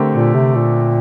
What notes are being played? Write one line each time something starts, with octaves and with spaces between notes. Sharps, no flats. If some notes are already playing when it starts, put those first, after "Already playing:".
Already playing: D3 A3 C4 G4 A#4
A#2
C3
A#2